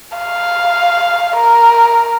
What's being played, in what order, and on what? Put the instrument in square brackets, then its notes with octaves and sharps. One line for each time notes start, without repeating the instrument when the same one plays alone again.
[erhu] F5
A#4